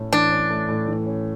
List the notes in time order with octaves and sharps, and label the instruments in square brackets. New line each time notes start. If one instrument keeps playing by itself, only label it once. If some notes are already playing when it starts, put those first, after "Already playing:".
Already playing: [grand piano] A2 A3 C#4
[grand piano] E3 [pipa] D4
[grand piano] C#4
A3
A2
E3
C#4